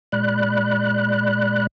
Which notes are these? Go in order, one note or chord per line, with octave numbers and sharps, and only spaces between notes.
A#2 G#3 D5 B5 F#6